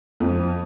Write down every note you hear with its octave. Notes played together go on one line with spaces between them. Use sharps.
F2